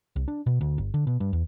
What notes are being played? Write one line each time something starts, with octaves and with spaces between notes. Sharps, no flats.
C2
D4
B2
D2
G1
D3
B2
G2
E2